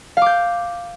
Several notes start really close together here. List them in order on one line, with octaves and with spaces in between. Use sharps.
F5 D6 G6